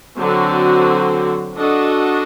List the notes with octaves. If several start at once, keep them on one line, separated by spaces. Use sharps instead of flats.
D3 F#3 C4 F#4
D4 F#4 A4 D#5